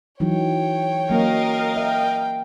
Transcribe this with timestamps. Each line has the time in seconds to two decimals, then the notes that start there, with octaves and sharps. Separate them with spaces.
0.20 E3 F#3 D#4 C#5 G5
1.10 F#3 A#3 C#4 A#4 D#5 F5
1.76 E5 G5